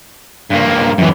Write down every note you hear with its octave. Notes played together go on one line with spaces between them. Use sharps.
G2 A#3
F#2 E3